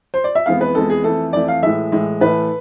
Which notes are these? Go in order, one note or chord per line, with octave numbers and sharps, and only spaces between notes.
C5
D5
E5
F2 E3 G#3 B3 F5
B4
F2 E3 G#3 B3 A4
G#4
F2 E3 A3 A4
F2 E3 A3 D5
F5
A2 E3 G#3 E5
A2 E3 G#3
A2 E3 A3 B4